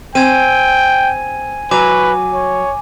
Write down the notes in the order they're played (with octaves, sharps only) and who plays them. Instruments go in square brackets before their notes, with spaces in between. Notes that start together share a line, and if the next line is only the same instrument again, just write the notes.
[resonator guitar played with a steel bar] C4 [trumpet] G5 [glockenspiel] G#5 G#6 D#7
[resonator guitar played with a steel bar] F#3 [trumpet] B4 [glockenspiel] G#5 D6
[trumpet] C#5